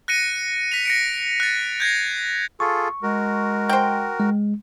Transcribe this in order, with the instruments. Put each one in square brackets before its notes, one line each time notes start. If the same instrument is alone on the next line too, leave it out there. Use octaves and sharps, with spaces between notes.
[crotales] F#6 A#6 C#7 D#7
B6 C#7 F7
A#6 C#7 D7
F#6 A6
G6 G#6 A#6 C7
[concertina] F4 G#4 A4 [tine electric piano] C#6
[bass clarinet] G#3 [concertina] F#4 A#4
[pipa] C5 G5
[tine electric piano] G#3